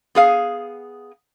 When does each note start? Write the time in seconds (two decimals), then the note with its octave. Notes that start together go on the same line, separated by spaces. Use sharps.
0.15 B3 G#4 F5